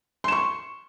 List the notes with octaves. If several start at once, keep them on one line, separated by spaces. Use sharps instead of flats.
C6 C#6 E7